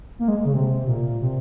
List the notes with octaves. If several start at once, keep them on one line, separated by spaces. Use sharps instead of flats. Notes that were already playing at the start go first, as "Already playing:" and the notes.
A#3
G#3
C#3
C3
A#2
C3